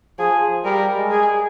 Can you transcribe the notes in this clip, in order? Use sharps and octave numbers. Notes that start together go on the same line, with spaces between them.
F3 G#4
G3 A#4
G#3
G#4